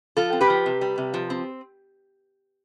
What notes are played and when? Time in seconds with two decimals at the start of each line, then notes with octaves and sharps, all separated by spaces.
0.17 F3 F4 A4
0.33 C4
0.41 G4 B4
0.50 F3
0.66 C3
0.81 G3
0.98 C3
1.14 F3
1.30 C4